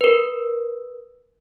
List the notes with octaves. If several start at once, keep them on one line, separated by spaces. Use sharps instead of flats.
A#4 B4